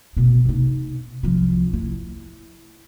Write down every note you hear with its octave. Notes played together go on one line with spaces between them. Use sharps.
B2 B3
C3 D#4
C2 F3
E4